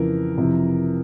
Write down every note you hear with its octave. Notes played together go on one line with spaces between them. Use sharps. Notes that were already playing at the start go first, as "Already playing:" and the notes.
Already playing: F2 C#3 E3 A#4
F2 C3 E3